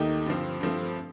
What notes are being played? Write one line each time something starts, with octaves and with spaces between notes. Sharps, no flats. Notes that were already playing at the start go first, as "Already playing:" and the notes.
Already playing: D#2 D#3 A3 D#4 G4
G2 D3 F3 C4
G2 F3 A3 C4